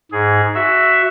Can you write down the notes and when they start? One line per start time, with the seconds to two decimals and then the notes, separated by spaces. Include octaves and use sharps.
0.12 G#2 G#4
0.54 F#4 E5